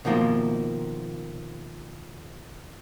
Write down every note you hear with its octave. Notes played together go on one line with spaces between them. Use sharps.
B2 D#3 F3 A#3